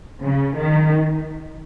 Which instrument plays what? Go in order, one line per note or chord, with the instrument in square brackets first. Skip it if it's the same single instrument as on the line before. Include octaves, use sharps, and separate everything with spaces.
[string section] C#3
D#3